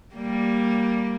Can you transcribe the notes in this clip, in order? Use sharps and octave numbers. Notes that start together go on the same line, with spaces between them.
G3 A#3